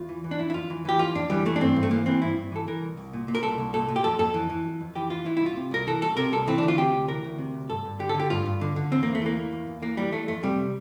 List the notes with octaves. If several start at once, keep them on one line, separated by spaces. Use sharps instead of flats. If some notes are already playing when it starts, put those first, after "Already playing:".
Already playing: E2 F4
E3
E3
D4
F2 E4
E4
F2 F4
E3
E3 G4
F2 F4
F2 D4
E3 G3
E3 A3
D4
G2 C4
G2
A3
E3 A#3
E3 C4
G2 E4
G2
E3 A4
E3 A#4
C2
C2
A#2
A#2
A#4
C2 A4
C2
A#2 A4
A#2
G4
F2 A4
F2 A4
E3
E3
F2
F2
E3 G4
E3 F4
E3 E4
C2 E4
F4
C3
C2 A#4
E3 A4
C2 A4
C3 A#4
C2 A4
E3 C4
D4
D2
F4
C3 G4
D2
E3 A#4
D2
C3
D2
G2 A4
G2
D3 G4
A4
D3
G4
G2 F4
G2
D3
D3
E2 C4
E2 A#3
A3
E3 A#3
E3
E2
E2
E3 A#3
E3 G3
E3 A3
F2 A3
C3 G3